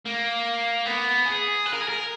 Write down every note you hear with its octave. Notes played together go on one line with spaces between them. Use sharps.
A#3
B3
G#4
B4
A#4
G#4
A#4